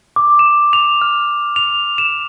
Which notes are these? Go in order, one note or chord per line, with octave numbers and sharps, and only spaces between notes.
D6
E7
F7
F6
F7
E7